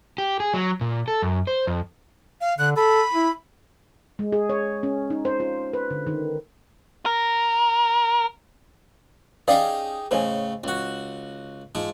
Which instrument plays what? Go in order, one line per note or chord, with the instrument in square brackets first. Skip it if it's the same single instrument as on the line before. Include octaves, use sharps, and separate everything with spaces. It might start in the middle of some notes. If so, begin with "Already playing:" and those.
[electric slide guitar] G4
G#4
F#3
A#2
A4
F#2
C5
F2
[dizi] F5
[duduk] D3 [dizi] F#6
[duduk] A4 [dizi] B5
[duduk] E4
[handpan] G#3
G#4
C#5
C#4
D#4
C5
F4
B4
D3
D#3
[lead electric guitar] A#4
[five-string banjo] C#4 D5 F5 [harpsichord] D#4 G4 G#4
[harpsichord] A2 C#3 [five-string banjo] C5 D#5 G#5
[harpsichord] C#2 F#4
G#2 F3